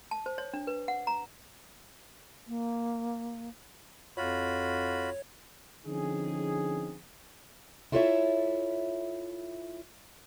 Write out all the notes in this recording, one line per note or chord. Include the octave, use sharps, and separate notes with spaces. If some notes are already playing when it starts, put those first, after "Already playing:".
A5
C5
C#5
D4
B4
F#5
A#5
A#3
F2 F4 F#4 C#5 B5
D3 F3 C4 C#4 D#4 G#4
E4 F4 A4 B4 C#5 E5